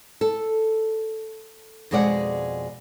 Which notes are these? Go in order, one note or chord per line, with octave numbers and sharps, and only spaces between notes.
A4
F2 B2 G#3 G#4 D5 F#5